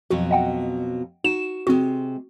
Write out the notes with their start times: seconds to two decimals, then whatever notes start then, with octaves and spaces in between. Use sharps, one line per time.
0.10 F2 B2 F#3 F#4
0.31 D#5 F#5 G5
1.24 D#4 F#4 E7
1.67 C3 G#3 C4 F#4